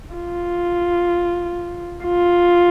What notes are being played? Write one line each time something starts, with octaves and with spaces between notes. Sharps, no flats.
F4
F4